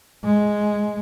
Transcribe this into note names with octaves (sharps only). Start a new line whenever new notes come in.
G#3